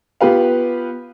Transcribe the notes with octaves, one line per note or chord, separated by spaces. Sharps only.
B3 F4 G4 B4 F5